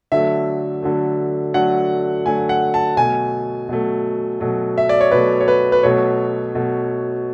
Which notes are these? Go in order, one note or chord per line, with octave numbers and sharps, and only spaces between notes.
D3 F#3 A3 E5
D3 F#3 A3
D3 F#3 A3 F#5
D3 F#3 A3 G#5
F#5
A5
B2 F#3 A3 G#5
B2 F#3 A3
B2 F#3 A3
E5
D5
C#5
B2 F#3 A3 B4
C#5
B4
B4
B2 F#3 A3 C#5
B2 F#3 A3